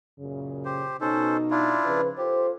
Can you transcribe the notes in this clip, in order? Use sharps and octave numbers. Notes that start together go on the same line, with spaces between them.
F#2 A#2 C#3
G4 C5
B2 C#4 D#4 A4 C5
D4 E4 F4
C#3 F3 B4
F4 G4 A4 C5